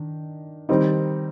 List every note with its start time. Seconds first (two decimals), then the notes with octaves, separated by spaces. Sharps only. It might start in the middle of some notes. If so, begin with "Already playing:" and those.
Already playing: D#3 D4
0.69 D#3 G3 C4 D#4